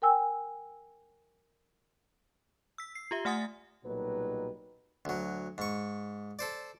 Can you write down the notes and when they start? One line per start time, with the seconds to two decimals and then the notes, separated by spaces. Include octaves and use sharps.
0.02 A#4 G5 G#5 E6
2.78 E6 B6
2.95 C7
3.11 F4 G4 E5
3.25 A3 F#5 G#5 D#6 A6
3.85 B1 A#2 F#3 G3 D#4 B4
5.05 D2 F#3
5.58 G#2 C#6
6.39 A4 C5 D5